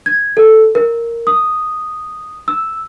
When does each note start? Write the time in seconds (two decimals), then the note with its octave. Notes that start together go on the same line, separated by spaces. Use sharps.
0.06 G#6
0.37 A4
0.75 A#4
1.27 D#6
2.48 E6